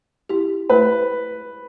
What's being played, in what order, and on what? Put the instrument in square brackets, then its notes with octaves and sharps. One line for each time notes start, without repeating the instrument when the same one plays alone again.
[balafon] E4 G4
[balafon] A3 [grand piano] B4